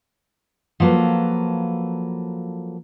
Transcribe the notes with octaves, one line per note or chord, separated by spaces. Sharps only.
F3 F#3 A#3 A4 B4